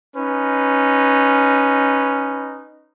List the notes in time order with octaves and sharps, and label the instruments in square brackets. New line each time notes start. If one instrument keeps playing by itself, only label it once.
[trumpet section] C#4 D#4 B4